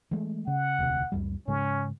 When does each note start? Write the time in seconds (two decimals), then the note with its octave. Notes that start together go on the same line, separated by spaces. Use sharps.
0.11 E3 G#3 A3
0.47 C#3 F#5
0.78 E1 D2 C3
1.12 C#2 F#2 G3
1.48 G#2 C#3 G#3 C#4